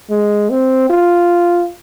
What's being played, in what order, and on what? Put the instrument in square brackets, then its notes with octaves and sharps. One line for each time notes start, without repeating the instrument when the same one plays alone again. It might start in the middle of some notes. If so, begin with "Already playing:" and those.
[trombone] G#3
C4
F4